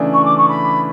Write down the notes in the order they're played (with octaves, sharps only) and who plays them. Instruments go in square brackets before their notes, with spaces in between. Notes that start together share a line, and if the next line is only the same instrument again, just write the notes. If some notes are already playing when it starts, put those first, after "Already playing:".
Already playing: [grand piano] C#3 E3 A3 D4
[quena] C#6
D6
C#6
B5